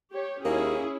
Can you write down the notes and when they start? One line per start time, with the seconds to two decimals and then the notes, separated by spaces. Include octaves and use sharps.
0.12 G4 C#5
0.45 D#2 A#3 C#4 E4 G#4